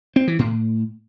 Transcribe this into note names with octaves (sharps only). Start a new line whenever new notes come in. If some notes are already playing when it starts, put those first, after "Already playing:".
C4
E3
A2